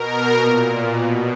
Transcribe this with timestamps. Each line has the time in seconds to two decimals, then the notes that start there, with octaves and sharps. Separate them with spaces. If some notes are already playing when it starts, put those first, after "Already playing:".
Already playing: B2 A#4
0.37 A#2
0.94 B2 B4